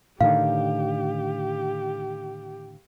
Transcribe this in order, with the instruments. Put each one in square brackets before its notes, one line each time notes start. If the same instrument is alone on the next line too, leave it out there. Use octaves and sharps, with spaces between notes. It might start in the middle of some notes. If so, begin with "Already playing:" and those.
[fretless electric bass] A2 D3 D#3 [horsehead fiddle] G4 [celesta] F5